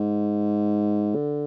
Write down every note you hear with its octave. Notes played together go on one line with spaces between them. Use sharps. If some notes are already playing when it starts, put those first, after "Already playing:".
Already playing: G#2
D3